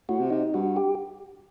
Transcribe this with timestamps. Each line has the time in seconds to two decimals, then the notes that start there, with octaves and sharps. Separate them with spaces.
0.08 A2 F#4
0.19 C3
0.30 C3 D#4
0.54 G2 F#4
0.76 G4